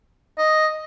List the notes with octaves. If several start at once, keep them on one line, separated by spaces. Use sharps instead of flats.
D#5